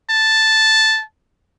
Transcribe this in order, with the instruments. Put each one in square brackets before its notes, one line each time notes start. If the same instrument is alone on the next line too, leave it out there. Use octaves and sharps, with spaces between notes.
[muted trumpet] A5